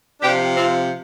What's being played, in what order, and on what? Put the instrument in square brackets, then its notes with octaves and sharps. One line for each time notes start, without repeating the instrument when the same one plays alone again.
[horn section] C3 F3 D4 G4
C4 F4